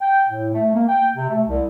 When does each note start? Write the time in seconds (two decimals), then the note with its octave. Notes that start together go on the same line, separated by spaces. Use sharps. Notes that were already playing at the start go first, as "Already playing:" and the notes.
0.01 G5
0.29 A2
0.53 A3
0.75 A#3
0.87 G5
1.16 C3
1.29 A3
1.48 C2